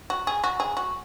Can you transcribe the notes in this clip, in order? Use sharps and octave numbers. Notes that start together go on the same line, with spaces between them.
F#4
G#4
F#4
G#4
F#4